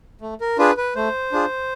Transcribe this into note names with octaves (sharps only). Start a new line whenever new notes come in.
A3
A#4
D4 F4 G#4 B4
B4
A3 C5
D4 F4 G#4